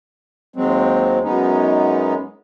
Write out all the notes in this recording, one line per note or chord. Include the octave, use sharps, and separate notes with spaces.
D#2 F#3 G#3 C4
F#2 G#3 B3 C#4 D#4